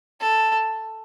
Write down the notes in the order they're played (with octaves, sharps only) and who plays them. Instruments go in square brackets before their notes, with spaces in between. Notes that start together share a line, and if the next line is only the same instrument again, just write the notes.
[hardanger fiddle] A4